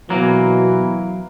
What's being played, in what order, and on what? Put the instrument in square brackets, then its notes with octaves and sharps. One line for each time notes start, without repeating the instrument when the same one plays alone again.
[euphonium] B2 [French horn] E3 [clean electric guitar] F#3 A#3